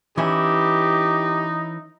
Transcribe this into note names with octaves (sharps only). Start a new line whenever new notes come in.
E3 C#4 D#4 E4 G4